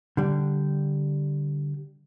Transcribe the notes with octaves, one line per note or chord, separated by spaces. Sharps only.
D3 G3